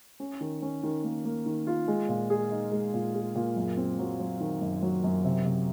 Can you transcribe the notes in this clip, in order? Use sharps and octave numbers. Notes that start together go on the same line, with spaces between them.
C#4
D#3
C#4
D#3
A#3
A#3
D#3
F4
G#3
A#2
G#4
D#4
G#3
A#2
G#4
A#2
F#2
C4
F#3
F#3
D#3
F#2
F#3
F#2
C3
C3